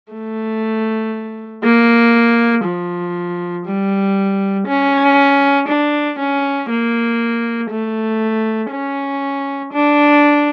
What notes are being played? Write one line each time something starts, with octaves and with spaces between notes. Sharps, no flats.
A3
A#3
F3
G3
C#4
D4
C#4
A#3
A3
C#4
D4